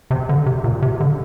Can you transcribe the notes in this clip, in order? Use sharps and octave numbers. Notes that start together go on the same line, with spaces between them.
C3
D3
C3
A#2
C3
D3